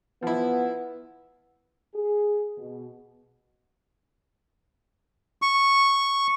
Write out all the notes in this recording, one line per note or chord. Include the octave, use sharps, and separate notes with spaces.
F3 B3 E4
G#4
B2
C#6